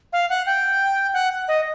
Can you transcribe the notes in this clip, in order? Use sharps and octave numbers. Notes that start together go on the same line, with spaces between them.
F5
F#5
G5
F#5
D#5